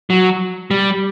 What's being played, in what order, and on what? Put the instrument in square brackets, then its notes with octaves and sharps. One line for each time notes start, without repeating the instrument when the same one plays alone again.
[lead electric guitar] F#3
G3